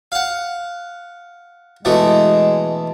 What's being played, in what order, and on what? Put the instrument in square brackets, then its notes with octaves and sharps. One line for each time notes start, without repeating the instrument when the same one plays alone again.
[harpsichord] F5 F#5
[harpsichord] B2 E3 A3 [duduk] G#3